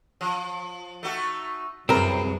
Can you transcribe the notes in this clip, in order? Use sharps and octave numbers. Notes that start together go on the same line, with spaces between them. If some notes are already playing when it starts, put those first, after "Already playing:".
F3
A3 D#4 F#4
C2 F#2 C#3 C4 G#4 A#4 B4